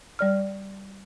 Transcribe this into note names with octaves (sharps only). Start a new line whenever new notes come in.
G3 D5 F6